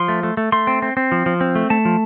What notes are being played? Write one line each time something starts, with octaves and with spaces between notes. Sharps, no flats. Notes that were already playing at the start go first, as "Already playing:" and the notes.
Already playing: F3 C6
A3
A3
A3
A3 C6
C4
C4
C4
F3
F3
C4
A3
A3 A5
F3